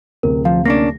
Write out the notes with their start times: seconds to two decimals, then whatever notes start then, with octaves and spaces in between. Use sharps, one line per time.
0.23 D1 C3 A#4
0.45 F3 F5
0.66 A#3 C#4 D4 A#6